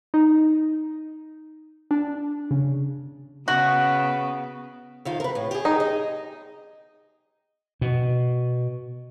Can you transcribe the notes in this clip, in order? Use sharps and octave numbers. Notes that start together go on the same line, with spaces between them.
D#4
D4
C#3
C#3 B3 F#4
F2 D#3 F4
A#4 B4
A2
G4 G#4
D#4
D#5
B2